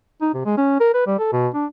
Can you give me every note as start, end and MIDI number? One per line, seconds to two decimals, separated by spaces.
0.21 0.29 63
0.34 0.43 48
0.46 0.54 56
0.57 0.78 61
0.80 0.89 70
0.94 1.05 71
1.06 1.15 55
1.19 1.29 69
1.32 1.48 47
1.54 1.65 62